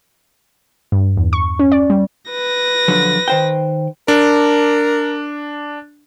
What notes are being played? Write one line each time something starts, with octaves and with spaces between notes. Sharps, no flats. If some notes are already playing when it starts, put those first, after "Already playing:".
G2
E2
C#6
C#4
D5
G3
B4 A#6
D3 F3 F#3
D#3 C5 G5
D4 A#4